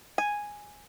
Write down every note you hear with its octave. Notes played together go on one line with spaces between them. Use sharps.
G#5